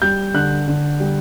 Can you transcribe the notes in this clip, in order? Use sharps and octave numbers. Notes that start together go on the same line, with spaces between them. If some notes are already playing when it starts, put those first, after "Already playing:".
G3 G6
D3 F#6
D3
G3